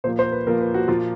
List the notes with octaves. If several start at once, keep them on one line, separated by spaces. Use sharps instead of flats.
A#2 F3 A#3 C5
C5
B4
A#2 F3 A#3 A#4
B4
F#4
A#2 F3 A#3 F4